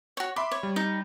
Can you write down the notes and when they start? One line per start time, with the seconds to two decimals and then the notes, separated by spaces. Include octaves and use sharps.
0.17 F#4 C#5
0.36 E5 B5 C6 D6
0.51 C#5
0.63 G3
0.76 D#4